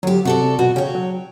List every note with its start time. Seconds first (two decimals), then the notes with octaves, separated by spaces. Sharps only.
0.03 D2 F#3 G4
0.25 C3 F#4 A4 D5
0.59 B2 F#4
0.76 C#3 C#5 G5
0.95 F#3